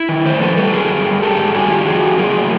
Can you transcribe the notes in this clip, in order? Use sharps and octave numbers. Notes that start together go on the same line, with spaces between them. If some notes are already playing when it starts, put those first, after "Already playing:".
Already playing: E4
D#3
A2 A#4 C5
F3 A4 B4
G3 A4 B4
F#2 G#4 A#4
G2
G2
G#2 G4 A4
G#2
G2 F#4 G#4
D#3 F4 G4
F2 F#4 G#4
F2
F#3 G#4 A#4
A2